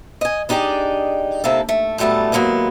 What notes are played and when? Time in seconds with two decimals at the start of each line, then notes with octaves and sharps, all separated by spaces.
0.21 D#5 G#5
0.49 D4 D#4 G4 G#4 D5
1.44 C3 A#3 E4 A4
1.69 A3
1.98 F#2 A2 G3 A3 B3 A5
2.32 D#2 G#2 F#3 A#3 B3